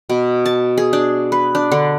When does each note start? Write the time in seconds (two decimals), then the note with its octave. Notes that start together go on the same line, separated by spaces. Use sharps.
0.09 B2
0.46 A5
0.78 G#4
0.93 D4
1.32 B4
1.55 D4
1.72 D3